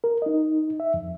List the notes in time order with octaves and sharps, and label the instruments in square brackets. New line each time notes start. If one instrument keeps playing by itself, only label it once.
[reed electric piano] A#4
D#4 D#5
E5
F2